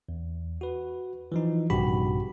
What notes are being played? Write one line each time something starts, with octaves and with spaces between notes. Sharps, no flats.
E2
F#4 B4
E3 F3 D#4
A#1 G2 C3 F#4 G4 B5